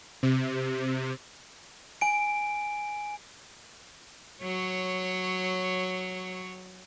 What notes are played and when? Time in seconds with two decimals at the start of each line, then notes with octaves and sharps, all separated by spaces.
0.23 C3
2.01 G#5 D7
4.43 F#3 C#5